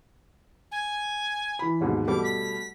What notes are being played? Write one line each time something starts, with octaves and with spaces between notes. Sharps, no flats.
G#5
E3 B5
D#2 G#2 B2
B2 G3 A3 D6
B6